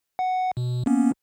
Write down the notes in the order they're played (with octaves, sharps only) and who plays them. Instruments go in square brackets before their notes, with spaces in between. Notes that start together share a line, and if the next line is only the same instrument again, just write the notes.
[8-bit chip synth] F#5
B2
A#3 B3 C#4